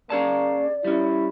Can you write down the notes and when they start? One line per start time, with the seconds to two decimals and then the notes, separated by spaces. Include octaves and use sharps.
0.10 A#3 C#4 G#4 D5 A5
0.85 G3 C#4 E4